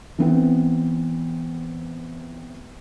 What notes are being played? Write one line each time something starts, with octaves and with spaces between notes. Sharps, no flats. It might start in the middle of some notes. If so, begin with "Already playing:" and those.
E3 B3 C4